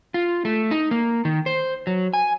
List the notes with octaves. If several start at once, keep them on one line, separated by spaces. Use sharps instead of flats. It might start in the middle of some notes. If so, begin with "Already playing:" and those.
F4
A3
D#4
A#3
D#3
C5
F#3
G#5